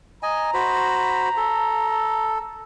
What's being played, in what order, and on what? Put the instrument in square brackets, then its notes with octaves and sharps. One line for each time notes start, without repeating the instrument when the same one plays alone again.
[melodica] D#5 G#5 [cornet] A#5
[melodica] F#4 C5 B5
A4